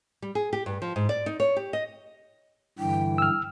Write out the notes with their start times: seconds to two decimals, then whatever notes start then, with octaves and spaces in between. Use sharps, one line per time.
0.22 G3
0.35 G#4
0.53 G4
0.66 G2
0.82 F3
0.96 G#2
1.09 D5
1.26 D#4
1.40 C#5
1.56 G4
1.73 D#5
2.79 G2 D3 E3 G5
3.18 E6 F6